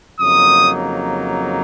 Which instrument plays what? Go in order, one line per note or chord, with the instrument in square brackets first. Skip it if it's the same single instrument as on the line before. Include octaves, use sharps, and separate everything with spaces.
[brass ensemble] F2 C#3 F#3 A#3 D#4 [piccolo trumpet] D#6